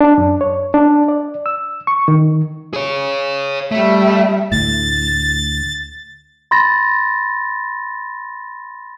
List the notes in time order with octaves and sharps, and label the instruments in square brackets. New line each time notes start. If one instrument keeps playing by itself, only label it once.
[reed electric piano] D4
F#2
C#5
D4
D5
E6
C#6
D#3
[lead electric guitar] G#4 C#5
[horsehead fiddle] G3 E5 [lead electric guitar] A3
[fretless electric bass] D2 A2 [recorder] A6
[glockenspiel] B5 C6 A6 A#6